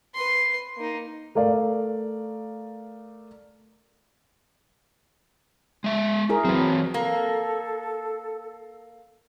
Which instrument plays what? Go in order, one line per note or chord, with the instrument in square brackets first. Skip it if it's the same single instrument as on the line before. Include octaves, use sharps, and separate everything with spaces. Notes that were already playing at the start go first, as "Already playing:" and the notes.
[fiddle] B4 C6
A#3 D#4
[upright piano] A3 A#4 D5 F5
[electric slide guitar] G#3 E5
[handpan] E4 G#4 A#4
[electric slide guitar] E3 C4 [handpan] F#3 B4
[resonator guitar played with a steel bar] A#3 [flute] A4